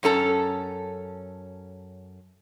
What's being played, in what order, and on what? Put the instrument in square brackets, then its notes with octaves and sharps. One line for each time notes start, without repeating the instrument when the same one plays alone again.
[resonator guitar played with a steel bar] F#2 C#4 A4 A#5